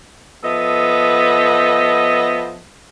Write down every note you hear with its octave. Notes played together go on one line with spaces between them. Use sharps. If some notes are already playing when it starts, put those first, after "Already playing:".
F3 B3 A4 D#5 E5